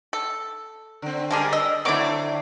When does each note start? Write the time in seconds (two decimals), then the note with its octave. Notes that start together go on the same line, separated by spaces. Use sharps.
0.13 A4
1.02 D3 C4
1.31 D3 G3 G#3 D4 G#4 A#4 D5
1.53 D#5 E6
1.85 D3 F#3 A3 C4 E4 C#5 D6